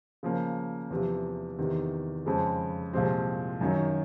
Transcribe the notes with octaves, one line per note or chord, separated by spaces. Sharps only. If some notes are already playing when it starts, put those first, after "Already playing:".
C#3 F3 A#3
E2 C3 F3
E2 C3 D#3
F2 C#3 F3 G#3
C2 A#2 F3 G#3 C4
F#2 D#3 F#3